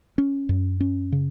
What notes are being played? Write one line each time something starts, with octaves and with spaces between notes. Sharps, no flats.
C#4
F#2
C#4
C#3